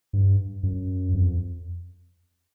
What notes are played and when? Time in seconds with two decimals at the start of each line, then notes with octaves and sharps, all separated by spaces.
0.13 G2
0.63 F#2
1.14 F2